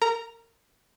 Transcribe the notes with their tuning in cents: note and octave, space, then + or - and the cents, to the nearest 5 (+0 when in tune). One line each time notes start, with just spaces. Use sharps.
A#4 -25 A#5 +0